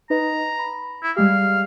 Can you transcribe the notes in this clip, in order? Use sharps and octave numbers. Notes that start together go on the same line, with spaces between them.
D#4 B4 D#5 A#5
B5
E4
G3 G#3 G4 F5